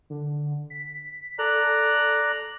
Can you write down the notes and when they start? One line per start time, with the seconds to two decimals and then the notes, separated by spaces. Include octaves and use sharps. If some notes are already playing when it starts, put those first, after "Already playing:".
0.10 D3
0.70 B6
1.39 A4 D5 A#5 F#6